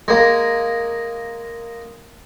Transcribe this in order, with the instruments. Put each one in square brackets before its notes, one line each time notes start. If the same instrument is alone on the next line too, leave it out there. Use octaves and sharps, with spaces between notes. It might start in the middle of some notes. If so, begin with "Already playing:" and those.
[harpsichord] G#3 A#3